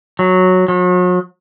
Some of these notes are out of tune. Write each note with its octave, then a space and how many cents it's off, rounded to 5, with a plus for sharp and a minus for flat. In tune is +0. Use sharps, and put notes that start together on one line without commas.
F#3 -5
F#3 -40